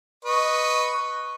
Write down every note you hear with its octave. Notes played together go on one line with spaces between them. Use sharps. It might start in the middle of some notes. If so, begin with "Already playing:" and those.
B4 D#5 C#6